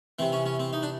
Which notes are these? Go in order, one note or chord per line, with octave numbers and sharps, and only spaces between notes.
C3 E3 C4
C#4
C#4
C4
D#4
D4